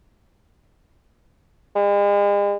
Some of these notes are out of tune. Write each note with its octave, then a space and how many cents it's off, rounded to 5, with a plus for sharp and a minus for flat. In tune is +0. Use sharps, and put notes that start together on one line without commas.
G#3 -45